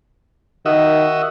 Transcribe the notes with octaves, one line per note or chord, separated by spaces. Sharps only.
D#3 F#4 D#5 E5